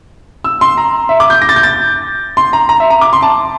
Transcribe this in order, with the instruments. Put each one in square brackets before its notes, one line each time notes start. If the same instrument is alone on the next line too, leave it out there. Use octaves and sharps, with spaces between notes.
[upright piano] E6
C6
A#5
E5
D6
G6
A#6
A6
G6
A6
C6
A#5
A#5
E5
A#5
D6
C6
A5